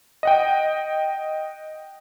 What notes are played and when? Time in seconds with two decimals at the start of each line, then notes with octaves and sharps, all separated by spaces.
0.23 D#5 F#5 G5